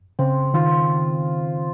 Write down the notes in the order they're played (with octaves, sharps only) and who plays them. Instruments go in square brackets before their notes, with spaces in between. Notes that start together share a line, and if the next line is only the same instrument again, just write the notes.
[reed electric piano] C#3 [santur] C4
[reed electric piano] D#3 [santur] F4